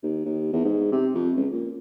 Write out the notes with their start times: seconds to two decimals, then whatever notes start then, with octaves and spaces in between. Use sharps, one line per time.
0.03 D#2
0.25 D#2
0.53 E2
0.64 G#2
0.92 C3
1.14 F2
1.36 C#2
1.52 A#2